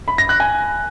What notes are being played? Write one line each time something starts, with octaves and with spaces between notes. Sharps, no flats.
B5
A#6
F#6
G#5